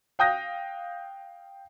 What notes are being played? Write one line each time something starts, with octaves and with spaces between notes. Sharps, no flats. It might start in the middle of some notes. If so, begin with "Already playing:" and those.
F5 G5 D#6 G6 A#6